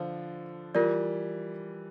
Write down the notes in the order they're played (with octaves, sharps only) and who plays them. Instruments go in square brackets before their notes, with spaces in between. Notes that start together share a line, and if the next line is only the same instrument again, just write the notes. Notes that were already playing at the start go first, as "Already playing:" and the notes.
Already playing: [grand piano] D3 F3 [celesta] C5 F5
[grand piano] E3 G3 [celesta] F4 A#4 D5